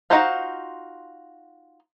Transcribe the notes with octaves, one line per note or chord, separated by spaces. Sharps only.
D#4 F4 F#4 C5 F5